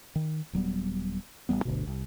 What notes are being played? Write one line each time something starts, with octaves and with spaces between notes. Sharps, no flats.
D#3
D#1 F#3 G3 B3
A1 D#3 G3 B3
G1 D2 B2
C2